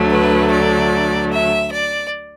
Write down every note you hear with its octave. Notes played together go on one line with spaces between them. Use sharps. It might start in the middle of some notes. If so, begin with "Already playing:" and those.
Already playing: D2 D3 F#3 A3
B4
D5
E5
D5